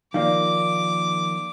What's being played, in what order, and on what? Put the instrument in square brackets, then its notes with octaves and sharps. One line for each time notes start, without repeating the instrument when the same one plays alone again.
[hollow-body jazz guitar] D#3 F3 A#3 [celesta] D5 F5 [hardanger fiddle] D6